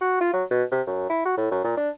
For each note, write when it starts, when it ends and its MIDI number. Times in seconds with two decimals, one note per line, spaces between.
0.01 0.18 66
0.21 0.32 65
0.33 0.44 54
0.51 0.64 47
0.72 0.81 48
0.87 1.09 42
1.10 1.23 64
1.25 1.35 66
1.37 1.48 45
1.51 1.60 42
1.64 1.74 46
1.77 1.90 62